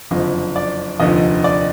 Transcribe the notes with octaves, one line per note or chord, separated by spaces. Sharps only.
F#1 F2 D3 F3 D#5
D5
F1 D#2 D3 F3 D#5
D5